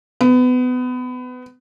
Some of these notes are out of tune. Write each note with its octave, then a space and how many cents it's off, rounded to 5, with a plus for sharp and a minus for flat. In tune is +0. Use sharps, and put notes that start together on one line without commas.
B3 +25